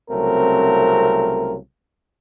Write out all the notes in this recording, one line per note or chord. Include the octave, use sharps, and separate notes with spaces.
C2 C#3 F#3 A3 C4 A#4